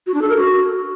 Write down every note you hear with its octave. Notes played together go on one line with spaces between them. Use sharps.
F#4
D4
A4
A#4
F#4